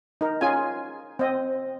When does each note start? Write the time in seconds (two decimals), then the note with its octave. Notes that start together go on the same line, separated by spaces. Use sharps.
0.21 D#4 A#4
0.41 C#4 F4 G#4 G#5
1.19 C4 D#5